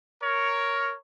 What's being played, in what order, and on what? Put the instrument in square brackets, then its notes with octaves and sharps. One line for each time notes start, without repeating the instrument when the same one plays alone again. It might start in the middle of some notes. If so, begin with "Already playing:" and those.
[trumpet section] A#4 C#5